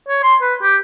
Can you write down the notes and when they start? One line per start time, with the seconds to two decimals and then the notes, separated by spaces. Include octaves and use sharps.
0.09 C#5
0.24 C6
0.42 B4
0.63 G4